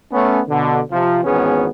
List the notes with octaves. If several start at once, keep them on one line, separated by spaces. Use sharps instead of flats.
A3 B3 C#4
B2 D3
C3 F3
G#1 E2 B3 C#4 G#4